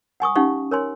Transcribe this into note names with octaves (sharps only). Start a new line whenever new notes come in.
F#5 G#5 C#6 D#6
C#4 D#4 G4 F5 F#5 C#6
A#4 C#5 G#5 C6